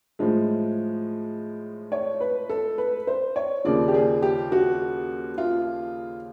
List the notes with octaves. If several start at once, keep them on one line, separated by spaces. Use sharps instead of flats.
A2 F3 G#3
C#5
B4
A4
B4
C5
C#5
D#2 C#3 F3 D5
G4
G#4
G4
F#4
F4